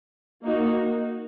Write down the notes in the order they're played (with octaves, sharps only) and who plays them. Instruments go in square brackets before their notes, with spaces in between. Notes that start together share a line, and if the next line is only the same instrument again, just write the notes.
[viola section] A#3 D#4 F#4